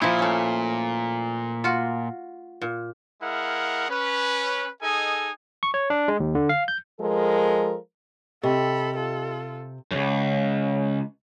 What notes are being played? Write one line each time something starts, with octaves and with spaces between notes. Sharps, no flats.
A#2 F3 E4
A3 C#4
F4 F#4
A#2
G#3 E4 A#4 F5 F#5
C#4 B4
D#4 G#4 A4 D#5 G#5
C#6
C#5
D4
G#3
D#2
D3
F5
G6
F3 G#3 A4 A#4
C3 G4 A4 D#5 G5 B5
F4 A4
C#2 F#2